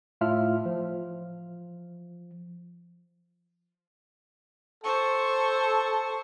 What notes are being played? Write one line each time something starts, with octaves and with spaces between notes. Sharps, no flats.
A2 F4 E5 F6
F3
A4 C5 C#6